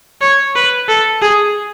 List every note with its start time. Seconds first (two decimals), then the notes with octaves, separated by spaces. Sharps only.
0.21 C#5
0.55 B4
0.88 A4
1.22 G#4